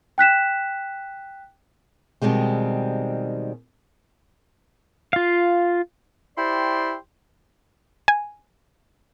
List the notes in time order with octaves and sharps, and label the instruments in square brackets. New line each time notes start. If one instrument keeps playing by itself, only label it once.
[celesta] G5 F#6 B6 E7
[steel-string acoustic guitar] B2 D#3 G3 G#3 C4
[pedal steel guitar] F4 F5
[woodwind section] E4 G4 C5 D5 G5 C6
[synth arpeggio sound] G#5